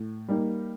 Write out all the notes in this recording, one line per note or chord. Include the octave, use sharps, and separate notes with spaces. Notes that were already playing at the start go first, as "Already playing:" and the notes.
Already playing: A2
G3 A#3 D#4